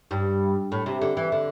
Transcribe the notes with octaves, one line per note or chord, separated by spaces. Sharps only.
G2
A2
C3
D3
E3
D3